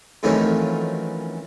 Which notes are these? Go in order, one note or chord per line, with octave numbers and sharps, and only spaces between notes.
F2 A2 D#3 E3 F#3 C#4